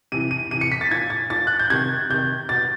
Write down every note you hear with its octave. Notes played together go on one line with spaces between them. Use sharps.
C3 E3 D#7
D#7
C3 E3 D#7
C#7
B6
A6
A#2 G#6
A6
A#2 A6
F#6
G6
C3 D#3 G#6
C3 D#3 G6
B2 A6